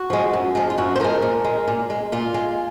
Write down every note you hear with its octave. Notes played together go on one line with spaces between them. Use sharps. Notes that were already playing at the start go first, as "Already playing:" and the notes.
Already playing: F#4
F3 G#3
F#2
F3 G#3
F4
F#2 F#4
C5
F3 G#3 A#4
A#2
G#3
A#2
G#3
A#2 F4
G#3